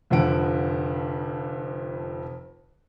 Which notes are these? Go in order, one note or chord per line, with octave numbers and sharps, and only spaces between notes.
F1 F2 D3 F3 F#5 D7